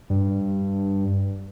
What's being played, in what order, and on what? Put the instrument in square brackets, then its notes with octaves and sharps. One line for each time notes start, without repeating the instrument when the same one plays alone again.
[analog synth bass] G2